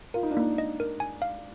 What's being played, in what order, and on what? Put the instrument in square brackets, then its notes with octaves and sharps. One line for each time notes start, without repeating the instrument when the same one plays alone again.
[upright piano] F4 [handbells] A#4
[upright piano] D#4
D4
[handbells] A#3 [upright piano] D#4
[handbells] D#5
A#4
G#5
F5